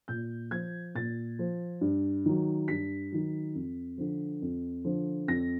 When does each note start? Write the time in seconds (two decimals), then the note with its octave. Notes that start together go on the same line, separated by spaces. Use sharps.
0.08 A#2 G6
0.51 F3 G#6
0.95 A#2 A6
1.39 F3
1.81 G2
2.26 D#3 F#3
2.68 G2 B6
3.12 D#3 F#3
3.55 F2
3.98 D3 F3
4.42 F2
4.85 D3 F3
5.28 F2 A#6